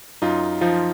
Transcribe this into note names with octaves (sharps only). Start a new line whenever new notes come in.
F#2 D#4 F4
F3 D#4 F4